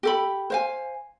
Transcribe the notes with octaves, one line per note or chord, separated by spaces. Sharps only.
G4 A4 B5
C5 F5 G#5